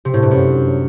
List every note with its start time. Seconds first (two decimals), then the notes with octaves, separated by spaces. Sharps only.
0.05 C3
0.14 A2
0.22 G2
0.31 F#2